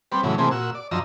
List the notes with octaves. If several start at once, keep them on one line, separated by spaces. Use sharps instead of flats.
G3 B3 C4
A2 C#3 E3 F#3
C3 E3 A3 A#3 C4 G#4
A#2 F#4 E6
D5
F#2 D3 F3 D#5 A#5 E6